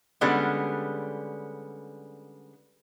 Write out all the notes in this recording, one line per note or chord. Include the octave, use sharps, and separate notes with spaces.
D3 G3 G#3 B3 C#4